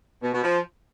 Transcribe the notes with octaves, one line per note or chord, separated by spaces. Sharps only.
B2
B2
F3